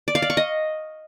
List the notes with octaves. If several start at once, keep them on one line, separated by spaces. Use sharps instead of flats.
D5
F5
D5
C#6
D#5